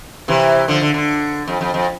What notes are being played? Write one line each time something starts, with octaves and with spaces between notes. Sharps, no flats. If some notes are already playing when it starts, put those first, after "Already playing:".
C3 E3
D3 F3
D3
D3
F2
F2
F2